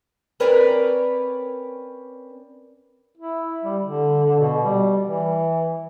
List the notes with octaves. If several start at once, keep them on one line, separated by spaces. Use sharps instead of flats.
C4 C#4 A#4 B4 C#5 D5
E4
G3
D3
B2
G3
E3